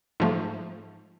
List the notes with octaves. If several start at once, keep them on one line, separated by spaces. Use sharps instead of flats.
G#2 F3 A3